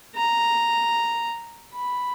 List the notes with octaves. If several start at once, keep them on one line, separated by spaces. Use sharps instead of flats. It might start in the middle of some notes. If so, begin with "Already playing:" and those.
A#5
B5